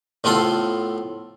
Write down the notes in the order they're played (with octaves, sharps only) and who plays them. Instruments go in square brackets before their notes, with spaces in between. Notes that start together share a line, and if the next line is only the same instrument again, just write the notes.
[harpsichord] A2 B3 C4 F4 A4 C6